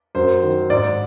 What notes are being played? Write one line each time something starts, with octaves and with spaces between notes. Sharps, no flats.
F#2 C5
D#3
G#2 D5